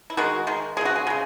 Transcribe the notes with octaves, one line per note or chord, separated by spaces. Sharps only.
E4
D#3 G#3 F#4
D#3 G#3
C#3 G#3 F#4 G#4
G#4
C#3 G#3